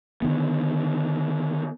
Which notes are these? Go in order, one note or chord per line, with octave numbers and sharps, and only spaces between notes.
D3 D#3 B3